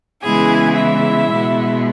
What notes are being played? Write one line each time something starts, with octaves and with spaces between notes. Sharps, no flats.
C#3 E3 G#3 B3 E4 G#4 G#5
E4 E5
B2 G#3 B3